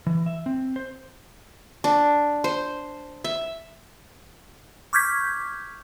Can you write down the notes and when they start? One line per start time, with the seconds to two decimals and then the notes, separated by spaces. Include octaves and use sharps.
0.07 E3
0.26 E5
0.46 C4
0.76 C5
1.84 D4
2.44 C5
3.24 E5
4.93 C#6 D6 F6 G6 G#6 B6